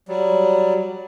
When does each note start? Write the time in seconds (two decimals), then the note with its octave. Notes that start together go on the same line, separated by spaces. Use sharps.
0.08 F#3 G3